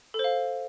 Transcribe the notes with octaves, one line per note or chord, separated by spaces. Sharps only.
A4
C5
F5